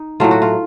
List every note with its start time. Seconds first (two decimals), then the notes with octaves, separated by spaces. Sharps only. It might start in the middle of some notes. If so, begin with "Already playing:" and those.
Already playing: D#4
0.20 A2 F#3 A3 F4
0.31 F#4
0.42 F4